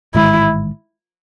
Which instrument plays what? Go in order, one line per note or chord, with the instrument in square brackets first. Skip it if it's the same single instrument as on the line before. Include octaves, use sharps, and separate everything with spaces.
[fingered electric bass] A1 G#2 D#3 G#3 [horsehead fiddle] E4